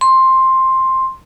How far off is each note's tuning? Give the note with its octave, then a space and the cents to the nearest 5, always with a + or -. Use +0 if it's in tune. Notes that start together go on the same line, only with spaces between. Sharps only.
C6 +10